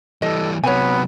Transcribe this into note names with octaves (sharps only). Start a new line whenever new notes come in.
E3 G3 A4 D#5
C3 F#3 B3 C#5 G#5